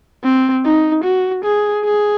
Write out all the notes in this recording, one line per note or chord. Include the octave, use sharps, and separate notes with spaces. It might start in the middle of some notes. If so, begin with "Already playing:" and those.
C4
D#4
F#4
G#4
G#4